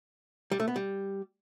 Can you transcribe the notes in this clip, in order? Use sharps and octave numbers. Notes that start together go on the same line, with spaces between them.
G3
A3
B3
G3